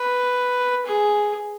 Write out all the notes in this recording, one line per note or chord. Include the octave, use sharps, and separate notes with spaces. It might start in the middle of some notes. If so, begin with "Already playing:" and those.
Already playing: B4
G#4